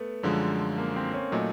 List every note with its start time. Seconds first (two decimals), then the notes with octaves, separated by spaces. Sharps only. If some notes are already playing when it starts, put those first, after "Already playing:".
Already playing: A3 B3
0.23 F#2 D3 F3 G#3
0.78 A#3
0.96 C4
1.14 C#4
1.32 A#2 F#3 A3 D#4